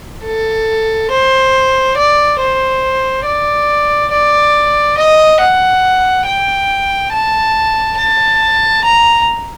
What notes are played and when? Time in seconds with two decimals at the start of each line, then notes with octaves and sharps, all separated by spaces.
0.25 A4
1.10 C5
1.97 D5
2.39 C5
3.25 D5
4.11 D5
4.97 D#5
5.40 F#5
6.26 G5
7.12 A5
7.97 A5
8.84 A#5